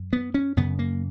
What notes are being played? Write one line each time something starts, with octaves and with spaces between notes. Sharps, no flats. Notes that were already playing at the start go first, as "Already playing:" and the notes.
Already playing: F#2
B3
C#4
F#2 C#3 B3
A#3